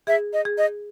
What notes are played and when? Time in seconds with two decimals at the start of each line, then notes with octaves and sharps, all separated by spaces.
0.07 G#4 E5
0.33 D#5
0.45 G#4
0.58 D#5